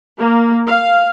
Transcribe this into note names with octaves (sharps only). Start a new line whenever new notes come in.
A#3
F5